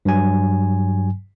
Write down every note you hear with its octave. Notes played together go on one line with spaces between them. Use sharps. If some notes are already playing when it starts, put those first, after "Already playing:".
G2 F#3 G#5